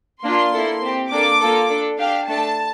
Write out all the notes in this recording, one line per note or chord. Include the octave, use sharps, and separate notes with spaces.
A#3 D4 F4 C6
A#3 E4 A4
C4 G4
A#3 D4 A4 D6
A#3 F4 A4
D4 A4
D4 G4 F5
A3 D4 A4 A5